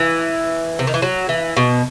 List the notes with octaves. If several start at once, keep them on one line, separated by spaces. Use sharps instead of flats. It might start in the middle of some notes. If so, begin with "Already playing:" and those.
Already playing: E3
C3
D#3
E3
F#3
E3
B2